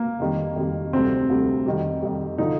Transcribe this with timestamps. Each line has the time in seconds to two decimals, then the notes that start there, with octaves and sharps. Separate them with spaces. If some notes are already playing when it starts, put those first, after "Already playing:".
Already playing: A#3
0.20 F2 D#3 G3
0.56 F2 D#3 G3
0.93 D2 C3 G3 C4
1.29 D2 C3 G3
1.66 F2 D#3 G3
2.02 F2 D#3 G3
2.38 D3 F3 D#4